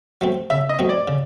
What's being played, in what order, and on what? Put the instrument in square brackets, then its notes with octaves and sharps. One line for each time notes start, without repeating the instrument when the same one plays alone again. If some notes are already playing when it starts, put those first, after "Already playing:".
[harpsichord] F#3 A3 C4
[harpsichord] C#3 [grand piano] E5
[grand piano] D#5
[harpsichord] F#3 A3 C4
[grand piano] D5
[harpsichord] C#3